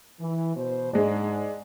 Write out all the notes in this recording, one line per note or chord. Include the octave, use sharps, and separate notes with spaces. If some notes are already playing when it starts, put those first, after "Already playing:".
E3
B2 C5
G#2 G#3 D4